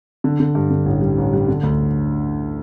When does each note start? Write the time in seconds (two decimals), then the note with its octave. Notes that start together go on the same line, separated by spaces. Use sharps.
0.24 D3
0.40 D3
0.55 G2
0.70 D3
0.86 A1
1.01 G3
1.18 A1
1.33 G3
1.48 D3
1.63 D2